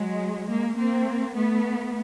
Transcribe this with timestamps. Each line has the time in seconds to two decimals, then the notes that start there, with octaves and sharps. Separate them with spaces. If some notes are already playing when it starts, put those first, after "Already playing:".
Already playing: F#3 G#3
0.49 G#3 A#3
0.78 A#3 C4
1.35 A3 B3